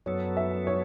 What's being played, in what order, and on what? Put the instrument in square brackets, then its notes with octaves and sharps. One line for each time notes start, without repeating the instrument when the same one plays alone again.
[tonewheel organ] F#2 F#3 B3 A4 [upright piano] C#5
[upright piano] E5
C#5